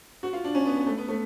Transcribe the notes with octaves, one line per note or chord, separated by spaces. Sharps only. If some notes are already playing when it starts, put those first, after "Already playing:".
F#4
F4
D4
C#4
B3
B3
A3
B3
A3